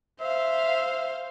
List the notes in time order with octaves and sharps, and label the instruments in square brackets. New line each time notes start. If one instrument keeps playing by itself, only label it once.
[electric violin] C5 F5 [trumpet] E5